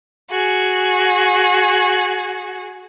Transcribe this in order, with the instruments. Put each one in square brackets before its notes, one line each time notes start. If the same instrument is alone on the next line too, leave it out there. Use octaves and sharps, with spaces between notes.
[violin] F#4 G#4